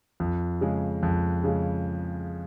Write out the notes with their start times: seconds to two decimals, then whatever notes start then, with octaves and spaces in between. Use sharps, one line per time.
0.20 F2
0.61 C#3 G#3
1.03 F2
1.44 C#3 G#3